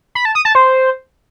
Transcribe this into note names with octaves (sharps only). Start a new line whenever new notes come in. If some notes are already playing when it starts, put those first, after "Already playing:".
B5
A5
D#6
A5
C5